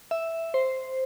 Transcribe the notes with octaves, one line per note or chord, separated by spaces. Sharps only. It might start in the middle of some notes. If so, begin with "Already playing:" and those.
E5
C5